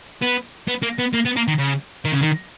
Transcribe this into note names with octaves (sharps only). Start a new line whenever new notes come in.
B3
B3
A#3
B3
A#3
B3
A#3
D#3
C#3
D#3
C#3
D#3